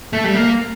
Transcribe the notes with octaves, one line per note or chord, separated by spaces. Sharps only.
A3
G3
A#3